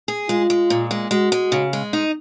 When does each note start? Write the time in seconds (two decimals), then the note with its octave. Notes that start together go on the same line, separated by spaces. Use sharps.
0.08 G#4
0.29 G#3 F4
0.50 G#3
0.70 A#2
0.91 G#3
1.11 G#3 F#4
1.32 G#3
1.52 C#3
1.73 G#3
1.93 D#4